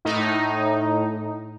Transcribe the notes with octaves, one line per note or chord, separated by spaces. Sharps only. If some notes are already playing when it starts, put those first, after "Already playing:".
A2 D#4